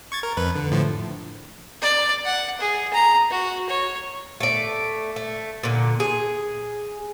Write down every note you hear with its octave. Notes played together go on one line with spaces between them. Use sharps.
C#6 G#6 A6
A#4
F2 B4
D3
A2 D3 F3
D5
F#5
G#4
A#5
F#4
C#5
A3 D5
A3
A#2 D3
G#4